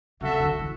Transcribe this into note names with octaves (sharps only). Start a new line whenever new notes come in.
C#3 F#4 A4 E5
D3
E3